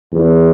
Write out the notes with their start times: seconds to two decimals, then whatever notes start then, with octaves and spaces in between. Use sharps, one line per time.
0.12 E2